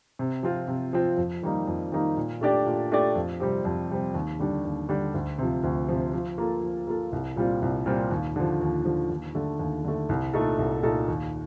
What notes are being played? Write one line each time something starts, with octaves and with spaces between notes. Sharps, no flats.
C3
F3 C4 F4
C3
F3 C4 F4
F2
D#3 G3 A#3 D#4
F2
D#3 G3 A#3 D#4
A#2
A3 D4 G4 D5
A#2
A3 D4 G4 D5
F2
C3 G3 C4 G4
F2
C3 G3 C4 G4
D#2
D3 G3 D4
D#2
D3 G3 D4
D2
C3 F3
D2
C3 F3
F3
A#3 F4 A4
F3
A#3 F4 A4
C2
A#2 G3 C4 F4
C2
A#2 G3 C4 F4
D#2
D3 F3
D#2
D3 F3
D#2
D3 A3
D#2
D3 A3
C2
A#2 A3 D#4 A4
C2
A#2 A3 D#4 A4
D#2